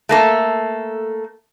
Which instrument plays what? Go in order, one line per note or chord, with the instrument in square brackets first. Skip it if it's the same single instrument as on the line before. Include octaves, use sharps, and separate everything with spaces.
[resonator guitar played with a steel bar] A3 A#3 A4